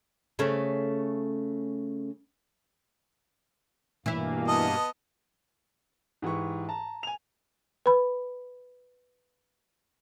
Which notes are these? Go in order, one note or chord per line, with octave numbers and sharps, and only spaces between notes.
C#3 A3 C#4
G2 B2 E3 A#3 E4
B3 D#5 A5 D#6
G#2 E3 G4 C#6
A5 A#5
G#5 F7
B4 B5